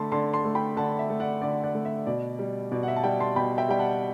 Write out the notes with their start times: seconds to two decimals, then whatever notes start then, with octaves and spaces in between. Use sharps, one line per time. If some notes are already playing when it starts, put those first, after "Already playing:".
Already playing: D3 A3 A5 B5 C6
0.12 D3 A5 C6
0.34 A5 C6
0.45 A3
0.55 G5 B5
0.76 D3 F#5 A5
0.99 E5
1.10 A3
1.20 D5 F#5
1.42 D3 D5 F#5
1.64 D5 F#5
1.74 A3
1.85 E5
2.07 B2 D5
2.39 G3
2.72 B2 D5
2.83 F#5
2.88 E5
2.96 A5
3.04 G3 E5 G5
3.20 A5 C6
3.36 B2 G5 B5
3.58 E5 G5
3.69 G3 G5
3.79 F#5 A5